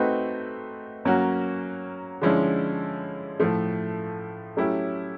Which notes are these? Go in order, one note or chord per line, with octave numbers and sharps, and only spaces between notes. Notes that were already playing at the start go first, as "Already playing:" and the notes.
Already playing: A3 C4 D#4 F#4 B4
F#3 A#3 C#4 F#4
D3 F3 G#3 C#4 E4
A2 F3 A3
F#3 A3 C#4 E4 G4